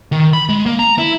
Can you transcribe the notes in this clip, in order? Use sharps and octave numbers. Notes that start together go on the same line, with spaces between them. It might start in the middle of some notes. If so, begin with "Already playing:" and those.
D#3
B5
G#3
A#3
A#5
E4